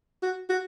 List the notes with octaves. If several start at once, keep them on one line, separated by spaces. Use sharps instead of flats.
F#4
F#4